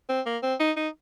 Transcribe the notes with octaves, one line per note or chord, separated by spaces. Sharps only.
C4
A#3
C4
D#4
D#4